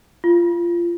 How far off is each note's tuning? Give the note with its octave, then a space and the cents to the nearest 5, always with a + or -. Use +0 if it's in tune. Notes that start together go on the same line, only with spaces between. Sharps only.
F4 -20